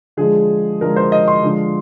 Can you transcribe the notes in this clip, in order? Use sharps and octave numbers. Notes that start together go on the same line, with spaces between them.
D3 F3 G#3 G#4
D3 F3 G#3 A#4
C5
D#5
C6
D3 F3 G#3